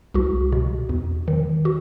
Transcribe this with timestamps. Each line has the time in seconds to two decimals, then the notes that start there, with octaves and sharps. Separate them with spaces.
0.14 C2 F#4
0.52 B2
0.89 E2
1.28 D#3
1.65 F#4